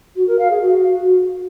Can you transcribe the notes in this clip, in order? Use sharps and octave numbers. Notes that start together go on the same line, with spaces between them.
F#4
A#4
F5
G#4
F#4